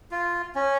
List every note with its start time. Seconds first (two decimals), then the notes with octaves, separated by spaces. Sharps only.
0.11 F4
0.55 C#4